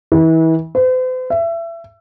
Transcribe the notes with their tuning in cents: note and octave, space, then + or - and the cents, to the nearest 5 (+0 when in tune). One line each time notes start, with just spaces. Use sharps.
E3 -30
C5 -45
E5 +25